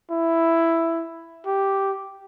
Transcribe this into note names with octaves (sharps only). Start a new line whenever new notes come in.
E4
G4